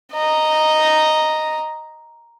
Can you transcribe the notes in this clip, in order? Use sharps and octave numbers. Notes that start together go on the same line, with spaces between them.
D#5 A#5